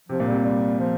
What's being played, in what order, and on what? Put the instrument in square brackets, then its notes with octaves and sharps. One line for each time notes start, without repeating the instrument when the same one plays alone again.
[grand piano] C3 [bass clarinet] F3
[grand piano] A#2
[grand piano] C3 [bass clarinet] G3
[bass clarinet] G3
F3